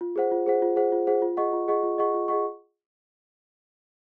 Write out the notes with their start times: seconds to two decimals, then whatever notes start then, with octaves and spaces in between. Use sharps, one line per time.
0.01 F4
0.16 G#4 C5 F#5
0.31 F4
0.46 G#4 C5 F#5
0.62 F4
0.76 G#4 C5 F#5
0.92 F4
1.07 G#4 C5 F#5
1.22 F4
1.37 G#4 D#5 F#5 C#6
1.53 F4
1.68 G#4 D#5 F#5 C#6
1.83 F4
1.98 G#4 D#5 F#5 C#6
2.14 F4
2.28 G#4 D#5 F#5 C#6